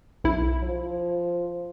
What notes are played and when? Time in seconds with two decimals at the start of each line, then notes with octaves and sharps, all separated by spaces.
0.24 B1 E4
0.63 F3